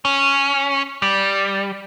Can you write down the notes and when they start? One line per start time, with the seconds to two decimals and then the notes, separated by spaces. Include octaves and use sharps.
0.05 C#4
1.02 G3